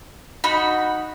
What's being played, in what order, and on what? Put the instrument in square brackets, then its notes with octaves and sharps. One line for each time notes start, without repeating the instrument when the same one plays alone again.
[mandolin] D#4 F#4 B5